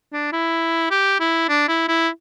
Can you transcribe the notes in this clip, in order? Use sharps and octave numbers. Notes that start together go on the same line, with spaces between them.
D4
E4
G4
E4
D4
E4
E4